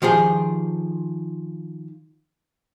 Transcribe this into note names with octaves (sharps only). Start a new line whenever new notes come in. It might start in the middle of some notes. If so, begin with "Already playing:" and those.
D#3 F3 G4 G#4